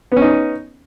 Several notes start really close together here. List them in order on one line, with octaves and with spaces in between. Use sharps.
B3 C#4 D#4